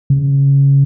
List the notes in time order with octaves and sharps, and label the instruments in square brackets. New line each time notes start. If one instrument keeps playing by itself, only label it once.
[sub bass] C#3